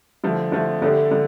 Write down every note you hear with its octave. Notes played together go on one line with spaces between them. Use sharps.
D3 F3 A3
D3 F3 A3
D3 A3 D4 G4
D3